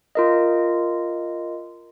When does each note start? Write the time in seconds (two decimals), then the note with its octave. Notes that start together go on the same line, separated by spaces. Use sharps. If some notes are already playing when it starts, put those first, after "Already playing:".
0.15 F4 A#4 D#5